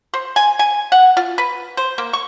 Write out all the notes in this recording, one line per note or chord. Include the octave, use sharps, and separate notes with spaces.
C5
G#5
G#5
F#5
F4
B4
C5
A#3
C#6